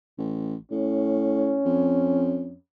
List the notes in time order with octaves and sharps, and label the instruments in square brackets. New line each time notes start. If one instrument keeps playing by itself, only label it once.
[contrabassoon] A1
[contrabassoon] A2 [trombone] C#4
[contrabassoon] F2